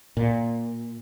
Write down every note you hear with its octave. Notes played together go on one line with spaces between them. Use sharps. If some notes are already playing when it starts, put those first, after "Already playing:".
A#2